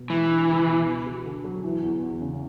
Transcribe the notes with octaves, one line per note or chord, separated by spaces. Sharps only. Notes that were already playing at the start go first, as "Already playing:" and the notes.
Already playing: B2
E3 G#3
D4
C#2
B2
B3
F#4
D3
F#3
E3
E2
E2
C#3